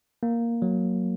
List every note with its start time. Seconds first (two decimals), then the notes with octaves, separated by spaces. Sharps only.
0.23 A#3
0.62 F#3